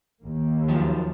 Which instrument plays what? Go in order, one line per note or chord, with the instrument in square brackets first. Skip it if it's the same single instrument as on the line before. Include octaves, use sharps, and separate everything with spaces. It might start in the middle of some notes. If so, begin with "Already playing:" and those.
[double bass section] D#2 A#3
[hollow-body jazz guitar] D#3 F3 F#3